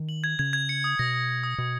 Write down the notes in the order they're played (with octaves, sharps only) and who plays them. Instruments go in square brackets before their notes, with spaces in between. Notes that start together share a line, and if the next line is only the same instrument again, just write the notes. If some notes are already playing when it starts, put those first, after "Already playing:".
Already playing: [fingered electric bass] D#3
[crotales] F#7
G#6
[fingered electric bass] C#3 [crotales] G#6
[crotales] G#6
C#7
D#6
[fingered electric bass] B2 [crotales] A#6
[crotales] D#6
A#6
D#6
[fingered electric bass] B2 [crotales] D#6